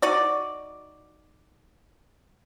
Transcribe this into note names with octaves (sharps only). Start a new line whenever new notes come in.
D#4 F#4 D5